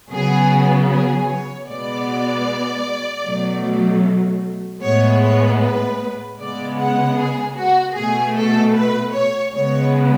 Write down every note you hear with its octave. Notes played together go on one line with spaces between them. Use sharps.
C#3 F#3 B3 G#4
G#4
C#5
B2 G#3 B3 D5
B2 F#3 A3
A2 G#3 B3 C#5
C#5
B4
C#3 G#3 B3 D5
F#5
G#4
F#4
B2 A3 G#4
A4
B4
C#5
C#3 G#3 B3 C#5